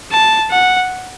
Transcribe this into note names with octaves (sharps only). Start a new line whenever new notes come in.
A5
F#5